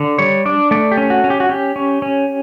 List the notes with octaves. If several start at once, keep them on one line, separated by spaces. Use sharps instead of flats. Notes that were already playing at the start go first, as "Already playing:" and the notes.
Already playing: D3
G3 C#5
D4 D5
A3 D5
G4
C#4
F#4
C#4
G4
F#4
C#4 G4
C#4
C#4